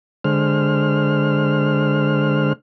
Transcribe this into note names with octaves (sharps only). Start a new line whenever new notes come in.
D3 G#3 C5 F6